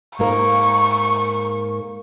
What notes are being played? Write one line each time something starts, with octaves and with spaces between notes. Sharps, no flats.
G#2 A#3 A#4 C#6